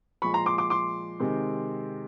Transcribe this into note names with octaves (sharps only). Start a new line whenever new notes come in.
A#2 F3 G#3 B5 C#6
A#5 C6
C6 D6
C6 D6
C6 D6
C3 D#3 G#3 C4